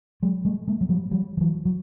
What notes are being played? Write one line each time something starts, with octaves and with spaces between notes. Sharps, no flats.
F#3 G#3
G3 A3
G#3 A#3
F#3
F3 G3
F3 G3
F3
E3 F#3
F#3